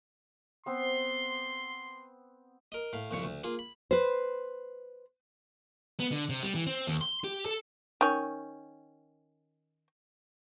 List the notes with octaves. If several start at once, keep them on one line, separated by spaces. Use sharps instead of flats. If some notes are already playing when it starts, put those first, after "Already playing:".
B3 C4 C6
A#4 D#5
A2 F5
C2 F2 C#3 C#5
D2
A#3 F4 G#4
B5
B4 C5
B3
D3
C3
G3
E3
C4
D#2
C6
G4
A4
D#3 C#4